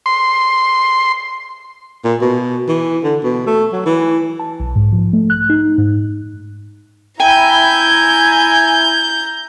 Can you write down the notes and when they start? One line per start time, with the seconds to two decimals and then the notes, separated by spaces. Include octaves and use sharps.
0.06 C6
2.04 A#2
2.21 B2
2.69 E3
3.04 D3
3.24 B2
3.47 A3
3.73 F#3
3.86 E3
4.39 A5
4.60 B1
4.76 G#2
4.92 F3
5.13 A3
5.30 F#6
5.49 D#4
5.78 G#2
7.20 E4 G5 G#5 A#5 G6